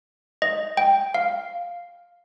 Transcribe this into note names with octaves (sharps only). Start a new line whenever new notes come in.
D#5
G5
F5